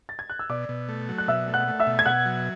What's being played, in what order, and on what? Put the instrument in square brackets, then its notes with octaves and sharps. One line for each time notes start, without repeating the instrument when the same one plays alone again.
[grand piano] A6
G#6
F#6
E6
[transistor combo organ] B2 [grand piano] D5 D6
[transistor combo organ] B2
A3
F#3
[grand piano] F#6
[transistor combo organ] B2 [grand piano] E5 E6
[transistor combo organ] A3
[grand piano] F#5 F#6
[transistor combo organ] A3
[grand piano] E5 E6
[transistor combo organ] B2
[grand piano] G#6
[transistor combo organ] B2 [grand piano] F#5 F#6
[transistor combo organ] F#3